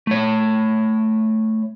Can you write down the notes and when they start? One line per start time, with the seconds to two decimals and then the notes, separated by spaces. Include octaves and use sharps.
0.07 A3 C#5